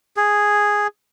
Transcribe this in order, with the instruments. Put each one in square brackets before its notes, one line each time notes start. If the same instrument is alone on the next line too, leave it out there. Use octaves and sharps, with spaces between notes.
[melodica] G#4